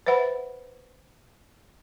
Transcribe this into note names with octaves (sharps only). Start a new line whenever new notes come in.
B4 C5 E5 F#5 B5